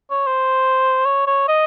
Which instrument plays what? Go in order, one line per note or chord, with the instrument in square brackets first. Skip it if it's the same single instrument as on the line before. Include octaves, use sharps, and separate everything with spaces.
[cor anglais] C#5
C5
C#5
C#5
D#5